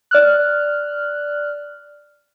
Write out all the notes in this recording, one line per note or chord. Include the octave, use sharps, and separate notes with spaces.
D5 F6 F#6